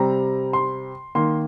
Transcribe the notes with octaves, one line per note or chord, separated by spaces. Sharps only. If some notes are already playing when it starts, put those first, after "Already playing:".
Already playing: C3 G3 C4 A#5
C6
D#3 A#3 C6